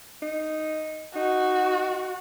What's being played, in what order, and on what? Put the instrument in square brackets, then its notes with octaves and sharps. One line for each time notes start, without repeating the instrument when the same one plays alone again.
[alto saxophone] D#4
[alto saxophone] D#4 [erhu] F#4